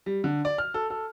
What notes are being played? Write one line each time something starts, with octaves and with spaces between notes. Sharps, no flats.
G3
D3
D5
F6
A4
A4